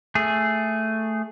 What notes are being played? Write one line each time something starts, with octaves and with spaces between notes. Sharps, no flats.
A3 G#4